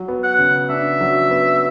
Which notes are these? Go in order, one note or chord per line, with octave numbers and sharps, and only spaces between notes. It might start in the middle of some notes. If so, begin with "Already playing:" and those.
Already playing: F#3
B3
F#5
C#3
D4 E5
F#3
B3